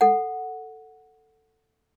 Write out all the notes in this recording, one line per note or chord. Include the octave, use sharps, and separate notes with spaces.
A4 F#5